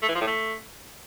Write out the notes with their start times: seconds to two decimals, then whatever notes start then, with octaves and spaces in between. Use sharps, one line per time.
0.03 A3
0.09 E3
0.15 F3
0.21 A2
0.27 A3